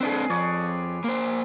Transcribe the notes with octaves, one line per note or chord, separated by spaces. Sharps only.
C4 D4 G#4 A4 B4
F2 C#5 D5
A#3 C5